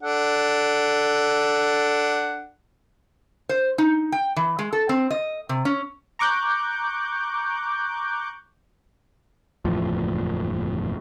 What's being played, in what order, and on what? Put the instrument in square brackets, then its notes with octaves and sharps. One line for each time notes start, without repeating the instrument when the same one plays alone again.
[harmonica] D4 A4 F#5
[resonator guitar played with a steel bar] C5
D#4
G5
E3
G#3
A4
C4
D#5
C3
C#4
[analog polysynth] A#5 C#6 D6 F#6 G6
[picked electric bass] F#1 E2 A2 F3